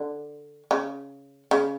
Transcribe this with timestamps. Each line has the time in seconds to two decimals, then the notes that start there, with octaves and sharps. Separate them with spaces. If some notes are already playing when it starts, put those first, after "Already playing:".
Already playing: D3
0.71 C#3
1.51 C#3